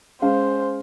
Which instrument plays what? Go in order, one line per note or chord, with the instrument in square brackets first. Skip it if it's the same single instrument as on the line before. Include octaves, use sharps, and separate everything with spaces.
[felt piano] G#3 C#4 F5 [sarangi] C5